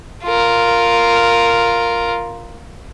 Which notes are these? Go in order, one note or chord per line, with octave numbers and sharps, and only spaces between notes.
F4 A#4